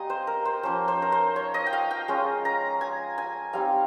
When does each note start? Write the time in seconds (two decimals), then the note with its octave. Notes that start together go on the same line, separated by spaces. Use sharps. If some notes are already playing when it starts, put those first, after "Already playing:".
Already playing: G3 C4 D#4 D#5 F5 G#5
0.10 C5
0.27 A#4
0.45 C5
0.63 F3 A#3 C#4 C5
0.88 C5
1.02 A#4
1.12 C5
1.36 C#5
1.54 D#5
1.66 G5
1.73 F5
1.91 G5
2.08 G#3 C#4 F4
2.45 A#5
2.81 G#5
3.18 G#5
3.53 G3 C4 D#4 F5